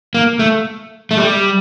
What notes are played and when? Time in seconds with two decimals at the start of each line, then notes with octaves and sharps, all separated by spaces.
0.15 A#3
0.39 A3
1.11 A3
1.18 G3